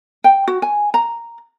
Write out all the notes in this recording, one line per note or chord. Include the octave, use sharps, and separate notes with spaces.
G5
F#4
G#5
A#5